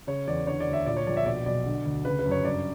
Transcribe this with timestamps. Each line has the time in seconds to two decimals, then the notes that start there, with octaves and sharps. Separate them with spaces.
0.07 C#3 C#5
0.28 E2 D5
0.47 D3 C#5
0.60 D5
0.67 D2
0.73 E5
0.86 A#2 D5
0.97 C#5
1.07 A#1 D5
1.17 E5
1.26 B2 D5
1.46 B1 D5
1.66 D3
1.86 D2
2.05 C#3 B4
2.19 B4
2.26 F#2
2.31 C#5
2.45 G2 D5